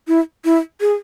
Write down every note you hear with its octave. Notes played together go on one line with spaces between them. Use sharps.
E4
E4
G#4